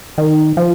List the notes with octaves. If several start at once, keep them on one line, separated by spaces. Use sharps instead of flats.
D#3
F3